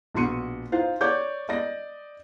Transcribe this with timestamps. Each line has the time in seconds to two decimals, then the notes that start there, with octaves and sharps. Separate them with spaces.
0.14 A#1 B2 F#4 C6 C#7 D#7
0.72 D#4 F4 C5 F5
1.01 C#5 D5 D6 G6
1.49 D5 D#5 A#6